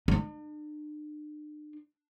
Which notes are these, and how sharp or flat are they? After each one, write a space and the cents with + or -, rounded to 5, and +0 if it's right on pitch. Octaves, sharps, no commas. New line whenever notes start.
D4 +40